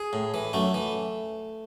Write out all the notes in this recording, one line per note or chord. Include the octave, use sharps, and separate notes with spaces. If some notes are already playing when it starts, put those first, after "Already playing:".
Already playing: G#4
A2
E3
F#2 A3
E3